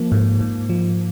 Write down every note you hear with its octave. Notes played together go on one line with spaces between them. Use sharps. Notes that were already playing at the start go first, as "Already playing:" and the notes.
Already playing: F3 A#3
G#2
G#2
F3